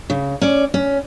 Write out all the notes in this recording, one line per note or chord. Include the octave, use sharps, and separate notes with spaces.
C#3
C#4 D5
C#4